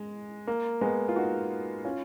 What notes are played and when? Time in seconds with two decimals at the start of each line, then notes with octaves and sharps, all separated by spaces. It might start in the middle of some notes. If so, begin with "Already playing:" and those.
Already playing: G#3
0.47 A#3
0.81 G#3 B3
1.09 F4
1.16 D#4 F#4
1.85 C#4 F4